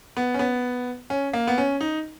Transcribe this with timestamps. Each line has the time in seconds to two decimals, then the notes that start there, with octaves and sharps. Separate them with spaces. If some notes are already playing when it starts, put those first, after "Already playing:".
0.17 B3
0.34 C#4
0.39 B3
1.10 C#4
1.33 A#3
1.47 B3
1.58 C#4
1.81 D#4